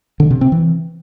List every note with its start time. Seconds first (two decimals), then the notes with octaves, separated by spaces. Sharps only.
0.20 D3
0.30 C3
0.41 C4
0.52 E3